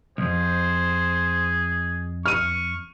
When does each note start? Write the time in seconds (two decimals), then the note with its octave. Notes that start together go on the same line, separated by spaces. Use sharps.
0.18 B1 F2 G#4 C5
2.26 C#6 F6 D#7